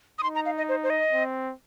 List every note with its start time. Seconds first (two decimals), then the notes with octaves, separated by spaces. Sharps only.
0.19 D#6
0.23 D#4 C6
0.35 A#5
0.45 F5
0.58 D#5
0.69 C5
0.83 C5
0.90 D#5
1.13 C4